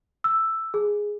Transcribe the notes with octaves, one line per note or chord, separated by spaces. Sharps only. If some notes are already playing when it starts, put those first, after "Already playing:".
E6
G#4